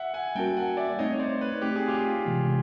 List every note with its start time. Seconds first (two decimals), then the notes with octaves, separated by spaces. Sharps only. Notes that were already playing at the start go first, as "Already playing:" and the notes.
Already playing: E5 F#5
0.14 F#5 G#5
0.35 G3 A#3 C#4 F#4 A#4 G5 A5
0.56 F#5 G#5
0.77 D5 E5
0.99 A3 C4 D#4 C#5 D#5
1.14 C#5
1.19 C5 D5
1.41 B4 C#5
1.62 A3 C4 D#4 G4
1.76 G#4
1.88 F4 G4
2.25 C3 E3 G#3 B3